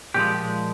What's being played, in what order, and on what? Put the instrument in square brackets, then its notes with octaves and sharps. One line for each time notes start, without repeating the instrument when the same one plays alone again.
[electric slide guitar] A#2 F3 G#3 G4